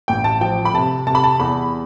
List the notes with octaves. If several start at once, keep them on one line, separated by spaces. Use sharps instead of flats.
A1 G5
A5
F3 G5
B5
C3 A5
C3 A5
B5
A5
E2 B5